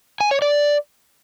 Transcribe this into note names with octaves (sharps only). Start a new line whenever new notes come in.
G#5
C#5
D5